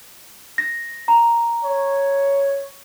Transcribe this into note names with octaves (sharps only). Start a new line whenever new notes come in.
A#6
A#5
C#5